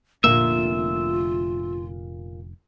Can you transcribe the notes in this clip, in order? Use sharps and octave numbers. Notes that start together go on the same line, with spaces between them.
F1 A#2 D3 A#3 F4 E5